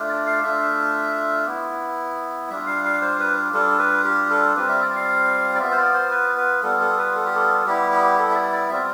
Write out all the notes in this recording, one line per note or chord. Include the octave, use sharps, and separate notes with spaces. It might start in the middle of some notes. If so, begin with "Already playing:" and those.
Already playing: A3 D4 F4
D5
F5
A3 D4 F4 E5
B3 E4
G3 D4 F4 E5
F5
F5
C5
B4
G3 D4 F4 A4
B4
G4
A4
G3 C4 F4 B4
E5
D5
F5
D5
B3 F4 E5
C5
D5
C5
B4
B4
G3 B3 F4 A4
A4
B4
A4
G4
A4
G3 B3 E4 G4
G4
A4
E5
D5
D5
G3 C4 F4 E5